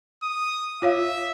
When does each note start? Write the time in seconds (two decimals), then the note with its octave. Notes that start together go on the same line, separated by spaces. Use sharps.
0.23 D#6
0.82 F4 C#5 E5 F5